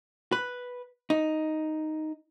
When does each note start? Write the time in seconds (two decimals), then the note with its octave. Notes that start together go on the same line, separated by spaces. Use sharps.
0.32 B4
1.10 D#4